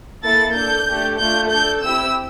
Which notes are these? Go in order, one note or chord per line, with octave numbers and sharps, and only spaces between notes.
A#3 E4 A4 A6
D4 A4 G6
A3 D4 G4
A3 D4 F4 G6
D4 A4 G6
C4 E4 G4 E6